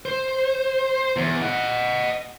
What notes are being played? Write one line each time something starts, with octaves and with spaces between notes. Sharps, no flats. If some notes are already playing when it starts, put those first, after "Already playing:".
C5
E2
D#5 F#5